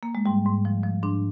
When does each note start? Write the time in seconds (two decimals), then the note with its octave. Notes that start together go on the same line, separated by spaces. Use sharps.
0.03 A#3
0.15 G#3
0.26 G#2 G3
0.46 G#2
0.65 F3
0.83 F3
1.03 G#2 D4